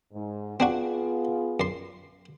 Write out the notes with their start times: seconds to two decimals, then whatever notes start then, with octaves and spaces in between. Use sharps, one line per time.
0.13 G#2
0.60 B3 C4 D4 F4 F#4 G#4
1.60 F#2 C6